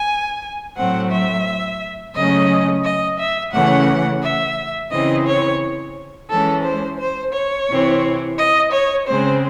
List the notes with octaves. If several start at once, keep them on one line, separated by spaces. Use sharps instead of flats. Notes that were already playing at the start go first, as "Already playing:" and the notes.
Already playing: G#5
A2 F#3 A3 C4 F#5
E5
C#3 F#3 A3 C#4 D#5
D#5
E5
C#3 E3 A3 C#4 F#5
E5
C#3 E3 C4 D#5
C#5
E3 G#3 C#4 A4
C5
C5
C#5
C3 E3 C4
D#5
C#5
C#3 G#3 C4 C5